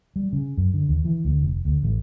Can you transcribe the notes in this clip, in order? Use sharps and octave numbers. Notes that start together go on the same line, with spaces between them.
G3
C#3
F#2
D3
D#2
E3
D2
F1
D2
A1